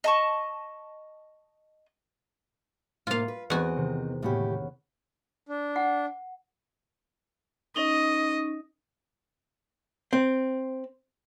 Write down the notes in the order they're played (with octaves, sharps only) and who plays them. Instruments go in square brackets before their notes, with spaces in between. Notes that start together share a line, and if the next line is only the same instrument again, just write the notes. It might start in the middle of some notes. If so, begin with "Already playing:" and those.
[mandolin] D#5 A5 C#6
[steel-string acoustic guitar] A2 C3 A#3 [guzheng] F4 F5
[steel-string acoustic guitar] B4
[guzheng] E2 F#4 [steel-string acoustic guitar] C4 D#5
[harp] C3 D#3
[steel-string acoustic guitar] A2 C#3 G4 [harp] A#3 B3 C#4
[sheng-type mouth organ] D4
[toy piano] F#5
[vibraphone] C#4 D#4 [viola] D#5
[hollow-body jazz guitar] C4